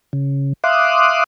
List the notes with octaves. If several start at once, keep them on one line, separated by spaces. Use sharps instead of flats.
C#3
E5 F5 C6 D6 D#6 F#6